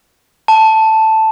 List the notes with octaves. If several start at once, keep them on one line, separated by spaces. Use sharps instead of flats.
A5